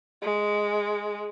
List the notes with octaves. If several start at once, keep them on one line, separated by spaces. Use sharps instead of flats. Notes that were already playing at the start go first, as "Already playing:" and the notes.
G#3